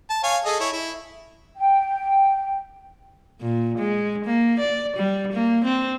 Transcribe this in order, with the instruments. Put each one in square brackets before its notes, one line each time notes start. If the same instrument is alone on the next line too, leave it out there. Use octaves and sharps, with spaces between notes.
[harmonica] A5
C#5 F5 G#5
G#4 A4 D#5
E4 C#5
E4
[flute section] G5
[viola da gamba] A#2
G#3
A#3
D5
G3
A#3
C4